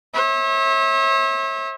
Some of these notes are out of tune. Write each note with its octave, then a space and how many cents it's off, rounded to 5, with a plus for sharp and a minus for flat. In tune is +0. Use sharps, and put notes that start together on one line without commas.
C#5 -45 E5 -25